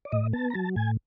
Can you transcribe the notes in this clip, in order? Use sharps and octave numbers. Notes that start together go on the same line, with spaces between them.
D5
A2 D#5
B3 A5
A#5
F#3 A5
A2 G#5